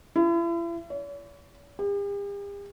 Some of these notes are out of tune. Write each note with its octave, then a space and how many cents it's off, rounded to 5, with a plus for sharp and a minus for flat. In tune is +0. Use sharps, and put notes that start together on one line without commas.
E4 +40
C#5 +45
G4 +45